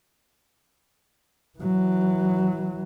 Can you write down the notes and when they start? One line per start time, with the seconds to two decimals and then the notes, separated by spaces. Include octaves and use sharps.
1.59 E3 F#3